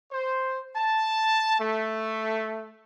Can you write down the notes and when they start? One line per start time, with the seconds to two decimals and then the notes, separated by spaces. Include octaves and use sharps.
0.12 C5
0.75 A5
1.59 A3